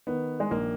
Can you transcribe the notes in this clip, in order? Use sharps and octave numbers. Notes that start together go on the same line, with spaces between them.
D#3 B3
G#3
A#1 A#3